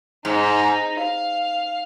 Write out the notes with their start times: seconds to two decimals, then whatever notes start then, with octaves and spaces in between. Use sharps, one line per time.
0.25 G#2 D#4
0.99 F5